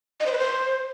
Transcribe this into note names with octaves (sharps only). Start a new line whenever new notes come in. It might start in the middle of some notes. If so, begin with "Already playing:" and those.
D#5
C5
B4
C5